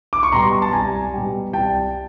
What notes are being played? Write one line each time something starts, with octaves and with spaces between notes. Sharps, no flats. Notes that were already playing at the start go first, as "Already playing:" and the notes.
D6
C#6
B2 G3 A#5 C6
A5
C2 G#5 A#5
B2 G3
C2 G5 A5